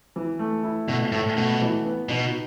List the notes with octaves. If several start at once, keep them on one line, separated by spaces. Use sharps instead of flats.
E3
A3
E4
B2 A3
A2 A3
B2 A3
E3
B3
B2 D#4